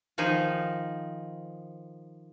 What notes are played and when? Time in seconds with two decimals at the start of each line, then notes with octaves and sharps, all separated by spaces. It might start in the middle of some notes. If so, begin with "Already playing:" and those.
0.18 D#3 F3 D#4 G#4